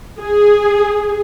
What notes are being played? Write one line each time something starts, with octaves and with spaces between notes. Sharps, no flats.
G#4